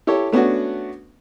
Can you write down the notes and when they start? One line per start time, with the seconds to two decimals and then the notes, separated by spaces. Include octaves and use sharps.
0.07 E4 G4 A4 C#5
0.32 A3 B3 C#4 D4 F#4